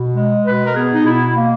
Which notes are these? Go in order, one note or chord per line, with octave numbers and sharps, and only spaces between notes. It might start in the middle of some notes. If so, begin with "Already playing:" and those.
Already playing: B2
G#3
B2 B4
A#4
B3 G#4
D#4
B2 E4
A#3